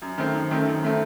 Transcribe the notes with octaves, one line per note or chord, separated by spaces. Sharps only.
F#2
D#3 A3 C4
F#2
D#3 A3 C4
F#2
D#3 A3 C4